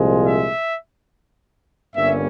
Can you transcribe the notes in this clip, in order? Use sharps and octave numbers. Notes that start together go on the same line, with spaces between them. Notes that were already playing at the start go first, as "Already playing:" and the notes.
Already playing: C2 A#2 F3 G#3
E5
G1 G2 G3 A#3 C#4 E5